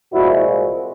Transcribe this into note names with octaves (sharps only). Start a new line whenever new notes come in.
C2 A#2 F3 G#3 E4 F#4